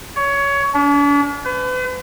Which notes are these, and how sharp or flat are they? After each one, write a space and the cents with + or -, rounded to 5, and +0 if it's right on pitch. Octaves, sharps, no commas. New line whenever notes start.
C#5 +20
D4 -45
B4 +40